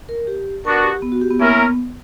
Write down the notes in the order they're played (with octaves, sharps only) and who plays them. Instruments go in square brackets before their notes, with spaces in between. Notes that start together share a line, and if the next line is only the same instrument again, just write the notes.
[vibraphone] A#4
G4
[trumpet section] B3 D4 F#4 [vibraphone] A#4
[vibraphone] G4
B3
F#4
G4
B3
[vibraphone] A#3 [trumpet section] C#4 E4 A#4
[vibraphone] B3